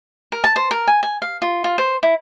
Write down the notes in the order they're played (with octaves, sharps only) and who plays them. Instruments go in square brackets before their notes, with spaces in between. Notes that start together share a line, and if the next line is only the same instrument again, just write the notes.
[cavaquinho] A#4
A5
C5
A#4
G#5
G#5
F5
F4
F4
C5
E4